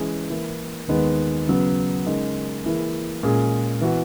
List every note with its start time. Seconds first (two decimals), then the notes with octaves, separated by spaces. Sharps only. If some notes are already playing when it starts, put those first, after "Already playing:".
Already playing: E3 G#3 C#4 G#4
0.30 E3 A#3 E4
0.88 D#2 D#3 G#3 B3
1.48 C#3 F#3 B3
2.05 C#3 G#3 D#4 A#4
2.64 E3 A#3 E4 G#4
3.23 A#2 G#3 C#4 G#4
3.81 E3 B3 F#4